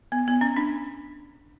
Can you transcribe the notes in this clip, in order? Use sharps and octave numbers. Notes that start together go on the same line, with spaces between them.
B3
B3
C#4
D4